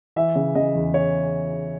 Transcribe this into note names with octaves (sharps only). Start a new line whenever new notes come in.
E3 E5
C#3
C#3 D#5
E2
C#5